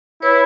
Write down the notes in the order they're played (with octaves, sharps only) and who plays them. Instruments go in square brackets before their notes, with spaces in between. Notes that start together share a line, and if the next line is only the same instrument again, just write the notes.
[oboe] E4 [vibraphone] B4 C#5